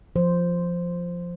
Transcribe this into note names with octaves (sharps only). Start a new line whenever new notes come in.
F3 C5